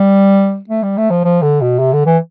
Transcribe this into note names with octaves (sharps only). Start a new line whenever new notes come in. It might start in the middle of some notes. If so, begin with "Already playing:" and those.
Already playing: G3
A3
G3
A3
F3
F3
D3
B2
C3
D3
E3